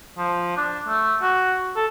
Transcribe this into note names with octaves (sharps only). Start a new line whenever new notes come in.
F3
D4
A3
F#4
A4